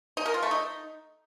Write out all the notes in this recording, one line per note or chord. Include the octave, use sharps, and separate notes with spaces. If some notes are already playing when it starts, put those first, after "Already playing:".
D#4
A#4
F4
A3
D#4